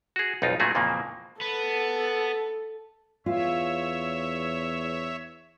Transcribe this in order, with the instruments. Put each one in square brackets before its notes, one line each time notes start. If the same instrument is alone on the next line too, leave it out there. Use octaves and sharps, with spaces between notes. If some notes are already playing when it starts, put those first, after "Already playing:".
[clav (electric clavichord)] F#4 G#4
B1 F2 D#4 F4
A#2 F#3 A3 F#4 G#4
F2 A#2 C#3 E3 A#3
[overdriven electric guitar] B3 [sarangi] A4
[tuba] E2 [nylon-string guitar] F4 [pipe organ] C#5 E5